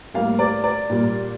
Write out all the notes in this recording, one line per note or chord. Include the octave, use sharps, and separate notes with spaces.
A2 G3 A#3 F5
D5
D5
A#2 G3 A#3